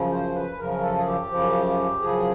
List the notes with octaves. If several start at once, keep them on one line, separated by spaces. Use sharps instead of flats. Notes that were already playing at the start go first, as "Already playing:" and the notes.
Already playing: F#2 C#3 F3
C5
B4
F#2 C#3 F3 A#4
A4
G#4
G4
F#2 C#3 F3
F#2 C#3 F3 G#4